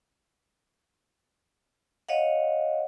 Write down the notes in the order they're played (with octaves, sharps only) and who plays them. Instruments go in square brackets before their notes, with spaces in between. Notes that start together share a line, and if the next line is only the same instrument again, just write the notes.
[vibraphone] C#5 D#5 F5 F#5